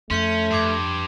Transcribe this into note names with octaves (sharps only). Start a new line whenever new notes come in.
F2 A3 C#4 C6 G6 C#7
G2 C6 D6 G#6